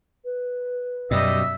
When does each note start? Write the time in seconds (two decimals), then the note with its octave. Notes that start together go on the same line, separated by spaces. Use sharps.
0.25 B4
1.11 F#2 B2 G3 D#5 E5